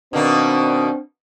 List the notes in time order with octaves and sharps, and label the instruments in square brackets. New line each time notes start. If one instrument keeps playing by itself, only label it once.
[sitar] B2 D#3 A#3 [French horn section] C4 D4